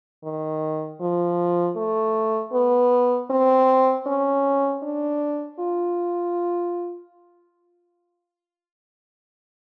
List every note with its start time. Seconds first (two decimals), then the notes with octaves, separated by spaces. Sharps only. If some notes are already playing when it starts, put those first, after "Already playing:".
0.24 D#3
1.01 F3
1.76 A3
2.53 B3
3.31 C4
4.07 C#4
4.83 D4
5.60 F4